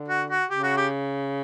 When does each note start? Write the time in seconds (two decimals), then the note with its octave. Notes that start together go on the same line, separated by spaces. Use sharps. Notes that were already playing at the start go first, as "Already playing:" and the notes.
Already playing: D3
0.08 F#4
0.30 F#4
0.50 C#3 G4
0.63 F#4
0.77 G4